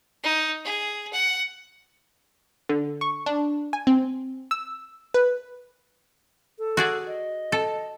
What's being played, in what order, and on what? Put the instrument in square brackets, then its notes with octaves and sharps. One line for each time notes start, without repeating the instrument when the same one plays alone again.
[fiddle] D#4
G#4
F#5
[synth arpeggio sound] D3
C#6
D4
G#5
C4
E6
B4
[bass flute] A4
[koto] F#4 G#4 D5
[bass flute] D#5
[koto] A4